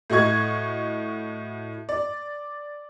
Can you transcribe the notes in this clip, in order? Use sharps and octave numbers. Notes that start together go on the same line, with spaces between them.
A2 F#4 D#5 C#6 G#6
D5